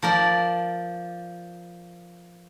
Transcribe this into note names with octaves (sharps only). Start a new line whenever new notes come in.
F3 A#4 D5